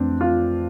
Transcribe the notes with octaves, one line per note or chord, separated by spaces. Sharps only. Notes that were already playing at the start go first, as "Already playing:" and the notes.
Already playing: F2 E3 A3 C4 D4
F4